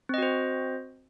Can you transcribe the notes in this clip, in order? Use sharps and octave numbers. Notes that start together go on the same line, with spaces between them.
C4 F#4 C5 D#5